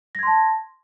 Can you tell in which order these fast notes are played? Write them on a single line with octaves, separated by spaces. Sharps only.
A#6 G#6 C6 A5